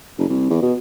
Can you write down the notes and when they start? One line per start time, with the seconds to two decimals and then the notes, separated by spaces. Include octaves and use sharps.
0.18 F#1
0.29 C2
0.50 E2
0.62 B2